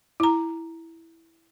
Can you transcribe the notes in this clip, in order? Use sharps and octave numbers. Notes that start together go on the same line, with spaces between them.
E4 A#5